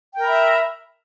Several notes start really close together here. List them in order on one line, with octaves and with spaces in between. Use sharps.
G5 A#4 B5 E5